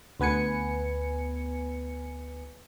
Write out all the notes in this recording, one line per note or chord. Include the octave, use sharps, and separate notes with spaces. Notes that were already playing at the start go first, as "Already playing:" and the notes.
D2 B3 B4 G#5 C#7